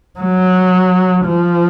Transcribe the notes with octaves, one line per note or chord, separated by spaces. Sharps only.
F#3
F3